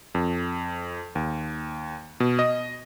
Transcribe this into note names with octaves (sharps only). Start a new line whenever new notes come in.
F2
D#2
B2
D#5